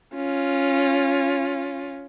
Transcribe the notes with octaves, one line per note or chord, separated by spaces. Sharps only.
C#4 F4